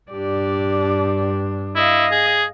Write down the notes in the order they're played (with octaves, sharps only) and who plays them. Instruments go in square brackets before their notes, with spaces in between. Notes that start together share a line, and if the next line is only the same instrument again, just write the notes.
[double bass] G2 D4 [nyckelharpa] G4 D5
[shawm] E4 [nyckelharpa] D#5 F5
[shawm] G#4